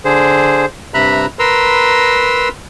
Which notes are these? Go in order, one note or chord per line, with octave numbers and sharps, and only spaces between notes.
D3 G#4 C5
G2 C3 E5 A#5 B5 F#6
A#4 B4 A#5 C6 E6